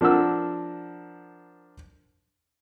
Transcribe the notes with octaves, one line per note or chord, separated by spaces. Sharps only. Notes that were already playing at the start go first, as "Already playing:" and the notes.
F3 D4 A#4 F#5 E6